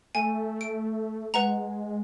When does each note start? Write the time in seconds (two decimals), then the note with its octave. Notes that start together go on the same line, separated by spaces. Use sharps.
0.15 A3 G#5
0.61 D7
1.34 G#3 B4 F#5 A#5